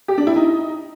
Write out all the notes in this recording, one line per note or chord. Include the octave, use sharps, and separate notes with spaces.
G4
D4
E4
D#4